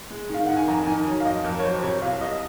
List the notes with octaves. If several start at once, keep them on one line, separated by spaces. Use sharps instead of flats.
G#3
D#3 F5
D#3 F#5
G#5
F2 A#5
D#3 G#5
F#3
F5
F2 D#5
F2 A#4
C#5
F#3 C5
C3 C#5
C2 F5
C2 D#5